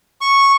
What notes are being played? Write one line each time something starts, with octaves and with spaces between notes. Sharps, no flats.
C#6